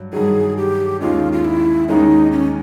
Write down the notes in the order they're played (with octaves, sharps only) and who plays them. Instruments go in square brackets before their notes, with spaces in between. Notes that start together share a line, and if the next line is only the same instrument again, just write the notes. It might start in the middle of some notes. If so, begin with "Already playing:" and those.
Already playing: [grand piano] G2 F#3
[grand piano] G2 D#3 F#3 [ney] G#4
[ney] G4
[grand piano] D#2 D#3 G#3 C#4 [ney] F4
[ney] F4
E4
[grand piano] D#2 D#3 G#3 C#4 [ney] D#4
[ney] C#4